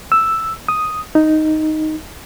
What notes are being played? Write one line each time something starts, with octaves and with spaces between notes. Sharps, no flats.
E6
D#6
D#4